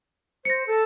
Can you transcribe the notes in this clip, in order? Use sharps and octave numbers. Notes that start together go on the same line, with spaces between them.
C5 A#6 C#7
A4